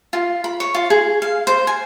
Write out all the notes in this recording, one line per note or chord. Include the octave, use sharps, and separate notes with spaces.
F4
B5
C#5
F4
G#4
F5
C5
G#5